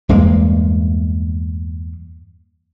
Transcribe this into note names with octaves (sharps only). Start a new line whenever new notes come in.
E2 G2 G#3 A#3